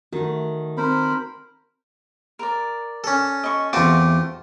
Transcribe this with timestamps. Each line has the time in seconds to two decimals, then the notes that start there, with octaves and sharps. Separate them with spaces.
0.13 D#3 A3 F#4
0.77 C4 A#4 C5 B5
2.39 A#4 D5
3.04 C#4 A4
3.44 D#5 C#6
3.73 E2 A3 C4 F4 F#4 C6 D6